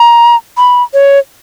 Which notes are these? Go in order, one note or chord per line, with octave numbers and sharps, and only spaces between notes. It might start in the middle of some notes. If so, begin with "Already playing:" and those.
Already playing: A#5
B5
C#5